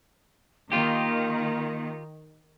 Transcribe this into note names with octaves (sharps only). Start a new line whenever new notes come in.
D#3 A#3 F4 G4